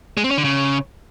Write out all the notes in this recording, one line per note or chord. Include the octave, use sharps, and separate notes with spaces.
G#3
C4
C#4
D3
C#3